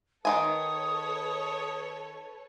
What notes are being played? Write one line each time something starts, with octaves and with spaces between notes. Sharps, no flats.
D#3 F4 A4 B4 C#5 G#5 D#6